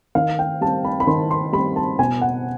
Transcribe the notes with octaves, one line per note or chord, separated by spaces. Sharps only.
D#3 F5
G5
G3 C4 A5
B5
B5
D#3 C6
C6
G3 C4 B5
A5
B2 G#5
F#5